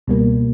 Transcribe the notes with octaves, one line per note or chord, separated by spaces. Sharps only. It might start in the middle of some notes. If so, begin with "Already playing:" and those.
C#2 B2 G3 A#3